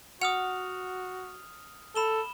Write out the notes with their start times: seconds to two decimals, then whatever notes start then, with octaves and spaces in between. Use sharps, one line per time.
0.21 F#4 F#5 D#6 F6 F7
1.95 A4 B5 E7 G7